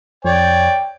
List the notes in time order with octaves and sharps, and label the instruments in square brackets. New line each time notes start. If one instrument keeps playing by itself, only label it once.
[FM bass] F2 [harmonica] C#5 D5 [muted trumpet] G5